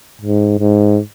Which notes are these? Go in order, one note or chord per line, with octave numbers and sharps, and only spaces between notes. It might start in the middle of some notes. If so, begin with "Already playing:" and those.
G#2
G#2